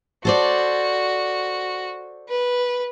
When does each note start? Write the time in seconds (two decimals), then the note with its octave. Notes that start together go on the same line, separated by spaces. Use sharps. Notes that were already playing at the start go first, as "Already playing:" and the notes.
0.25 F#4 A4 C5 D5
2.29 B4